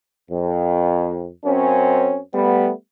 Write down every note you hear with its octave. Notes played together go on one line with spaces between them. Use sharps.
F2
F#2 C4 C#4
G3 A3 B3